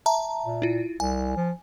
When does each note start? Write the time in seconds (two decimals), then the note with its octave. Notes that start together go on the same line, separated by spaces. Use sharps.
0.06 E5 A5 A#5
0.46 A#2
0.62 E4 F4
1.00 C2 G#5
1.36 F3